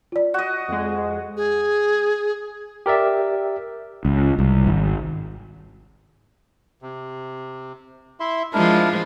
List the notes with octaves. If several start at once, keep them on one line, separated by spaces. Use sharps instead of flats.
F4 D5
F#4 D#5
F2 G#3
G#4
G4 A#4 D5 E5
C#2
C2
G#1
C3
E4 E5 C6
F3 G#3 D4 E4 A#4